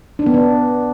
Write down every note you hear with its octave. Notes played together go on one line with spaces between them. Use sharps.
D4
B3
D4